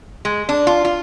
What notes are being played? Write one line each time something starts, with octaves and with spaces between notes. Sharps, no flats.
G#3
D4
F4
F4